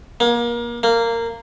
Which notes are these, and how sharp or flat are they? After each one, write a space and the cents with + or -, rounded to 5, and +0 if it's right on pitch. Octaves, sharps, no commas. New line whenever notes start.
A#3 +30
A#3 -15